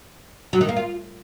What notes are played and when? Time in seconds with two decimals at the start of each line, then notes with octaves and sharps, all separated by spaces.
0.53 F#3
0.61 D#3
0.69 A#3
0.77 F4